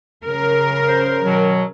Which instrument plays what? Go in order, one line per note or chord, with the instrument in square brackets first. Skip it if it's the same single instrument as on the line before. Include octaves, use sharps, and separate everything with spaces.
[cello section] C#3 A#4
[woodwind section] C5
B2 D#3 F#3